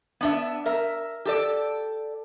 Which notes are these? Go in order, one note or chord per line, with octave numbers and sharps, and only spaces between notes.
B3 D4 E5
A#4 E5
G4 A4 D5